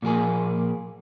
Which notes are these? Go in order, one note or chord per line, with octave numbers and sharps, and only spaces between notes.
A#2 F3 A#3 G#4